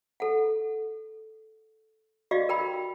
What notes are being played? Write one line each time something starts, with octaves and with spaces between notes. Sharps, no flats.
A4 F#5
F#4 G4 D5 D#5 F5
A#4 G5 B5